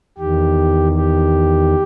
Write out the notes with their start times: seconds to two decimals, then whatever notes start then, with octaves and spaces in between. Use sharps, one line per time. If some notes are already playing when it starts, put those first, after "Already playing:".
0.18 E2 D#3 G4
0.96 G4